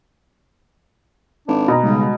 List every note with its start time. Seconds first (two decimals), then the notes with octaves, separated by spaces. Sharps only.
1.47 G#1 D4
1.68 B2 A#5
1.83 B1 C#3 G3 G#3 D#4